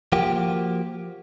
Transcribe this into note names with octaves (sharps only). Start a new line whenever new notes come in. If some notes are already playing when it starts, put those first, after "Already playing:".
F3 A#3 F#4 G4